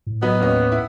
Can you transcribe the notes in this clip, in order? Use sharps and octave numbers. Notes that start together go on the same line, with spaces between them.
A2
F#3 B3 B4 D#5
D#2 C#4 D#5
E4